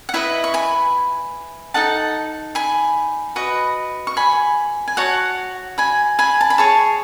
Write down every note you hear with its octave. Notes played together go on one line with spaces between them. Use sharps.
F#5
E4 B4 D#5 E5
C#6
G#5 B5
D#4 A4 D#5 F#5 A5
G#5 B5
F#4 B4 D#5
C#6
G#5 B5
G#5
F#4 C#5 F#5 A5
G#5 B5
G#5 B5
A5
B5
G#4 C#5 A5 C#6